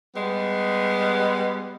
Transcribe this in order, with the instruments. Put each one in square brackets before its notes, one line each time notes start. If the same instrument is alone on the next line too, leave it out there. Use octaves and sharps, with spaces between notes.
[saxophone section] G3 G#3 B3